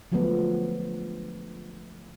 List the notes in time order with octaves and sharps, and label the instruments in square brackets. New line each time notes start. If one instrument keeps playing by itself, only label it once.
[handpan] D3 F3 F#3 G#3 A3 B3